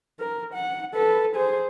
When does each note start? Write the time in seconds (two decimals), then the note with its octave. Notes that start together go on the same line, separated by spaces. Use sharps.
0.19 A#4
0.54 F#5
0.94 A4 B4
1.36 G#4 C5